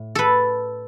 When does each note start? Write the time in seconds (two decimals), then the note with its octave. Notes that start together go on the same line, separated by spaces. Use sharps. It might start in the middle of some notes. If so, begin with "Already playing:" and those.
Already playing: A2
0.15 A4 B4